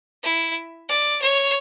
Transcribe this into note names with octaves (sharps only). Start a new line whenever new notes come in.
E4
D5
C#5